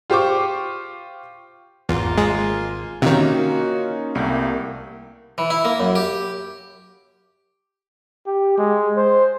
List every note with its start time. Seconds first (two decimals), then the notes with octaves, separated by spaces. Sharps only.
0.10 F4 G4 C5 C#6 D6
1.89 G#1 E2 A#3 F4
2.18 G#3 G#5
3.02 C3 D#3 A#3 C#4 D#4 F4 F#4
4.15 C2 G3 A3 A#3
5.38 E3
5.50 E4
5.65 A#3
5.80 F#2
5.95 G4
8.27 G4
8.58 G#3
8.97 C5